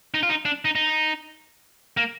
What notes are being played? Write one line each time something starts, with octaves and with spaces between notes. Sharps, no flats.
D#4
F4
D#4
D4
D#4
D#4
A#3